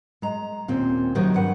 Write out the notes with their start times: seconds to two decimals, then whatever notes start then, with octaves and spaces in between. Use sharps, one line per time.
0.22 G#3 A#5
0.68 D#2 A#2 C4 C#4
1.15 C3 D#3 F3 F#3 D#4 G4
1.34 G2 B4 F#5